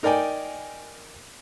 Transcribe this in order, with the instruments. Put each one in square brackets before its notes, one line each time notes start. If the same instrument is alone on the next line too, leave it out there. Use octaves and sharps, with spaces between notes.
[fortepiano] D#4 A#4 D5 G5 G#5